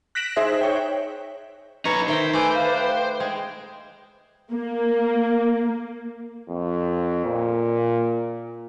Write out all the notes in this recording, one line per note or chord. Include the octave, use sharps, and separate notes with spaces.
F#6 A#6 B6 D7 E7 F#7
D#4 G#4 C5 E5
C#5 G5
D#4 B4 C#5 A#5
D#3 C5 E5 G5
A3 B4 D5 G#5
F5
G5
G#3 G5
A#3
F2
A#2